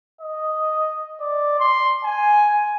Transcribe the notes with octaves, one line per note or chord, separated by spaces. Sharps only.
D#5
D5
C6
G#5